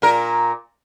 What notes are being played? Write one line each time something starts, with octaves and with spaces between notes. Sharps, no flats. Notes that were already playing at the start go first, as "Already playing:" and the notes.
A#2 A#4